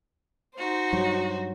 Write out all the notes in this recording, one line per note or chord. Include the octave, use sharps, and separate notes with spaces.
D#4 F#4 C5
G2 F#3